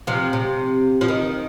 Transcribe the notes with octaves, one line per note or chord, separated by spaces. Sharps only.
C3 F3
C3
F3
D#3